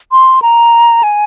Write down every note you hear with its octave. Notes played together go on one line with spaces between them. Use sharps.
C6
A#5
G#5